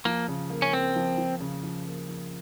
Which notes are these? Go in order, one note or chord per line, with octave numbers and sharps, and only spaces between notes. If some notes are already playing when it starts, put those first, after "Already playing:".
F3 A#3
C#3
A#3
C#4
A#3 C4
F3
F3
C#3
F3
A#3
F3